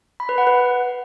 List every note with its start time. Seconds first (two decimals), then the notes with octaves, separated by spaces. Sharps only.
0.20 B5
0.29 B4
0.38 F#5
0.47 B4